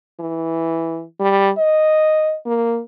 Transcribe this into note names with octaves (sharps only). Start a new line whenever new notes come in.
E3
G3
D#5
A#3